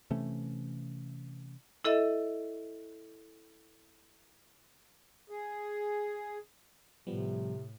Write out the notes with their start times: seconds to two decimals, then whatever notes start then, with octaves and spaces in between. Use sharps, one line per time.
0.10 C3 E3 A3 C#4
1.85 E4 A4 D#5 E5
5.30 G#4
7.07 A2 C3 F3 G3 B3